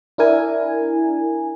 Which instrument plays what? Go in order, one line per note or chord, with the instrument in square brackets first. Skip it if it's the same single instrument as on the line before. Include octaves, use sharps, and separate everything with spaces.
[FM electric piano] D4 E4 A#4 G#5